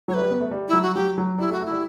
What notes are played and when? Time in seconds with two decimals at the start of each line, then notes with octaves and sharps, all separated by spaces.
0.08 F#3 C#5
0.14 A3 B4
0.19 G3
0.30 B3
0.40 A3
0.51 G3
0.69 F#3 E4
0.82 F#4
0.95 F#3 G4
1.18 F#3
1.38 G3 E4
1.50 A3
1.52 F#4
1.61 A3
1.66 E4
1.71 G3